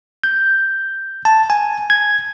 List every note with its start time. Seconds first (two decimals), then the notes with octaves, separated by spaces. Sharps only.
0.24 G6
1.25 A5
1.50 G#5
1.90 G#6